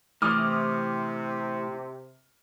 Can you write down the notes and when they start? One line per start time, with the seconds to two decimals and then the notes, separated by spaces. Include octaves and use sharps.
0.22 A2 C3 E3 D6 D#6 F6